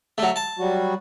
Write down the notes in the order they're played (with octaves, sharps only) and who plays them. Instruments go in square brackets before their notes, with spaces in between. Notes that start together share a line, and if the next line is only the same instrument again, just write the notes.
[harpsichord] F#3 A3
A5
[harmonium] F#3 G3 F#4